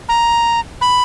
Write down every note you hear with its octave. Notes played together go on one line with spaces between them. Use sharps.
A#5
B5